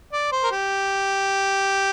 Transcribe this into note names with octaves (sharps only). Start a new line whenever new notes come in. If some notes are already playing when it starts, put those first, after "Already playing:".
D5
C5
A#4
G4